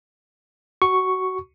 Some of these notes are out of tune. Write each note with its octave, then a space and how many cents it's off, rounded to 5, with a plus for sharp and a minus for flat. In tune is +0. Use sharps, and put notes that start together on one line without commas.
F#4 +20 C#6 +0